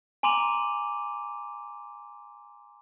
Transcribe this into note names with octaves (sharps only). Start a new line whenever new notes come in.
G#5 A#5 C6 D6 D#7 F7